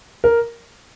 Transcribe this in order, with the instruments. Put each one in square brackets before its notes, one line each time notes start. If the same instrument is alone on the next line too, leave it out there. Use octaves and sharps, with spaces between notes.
[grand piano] A#4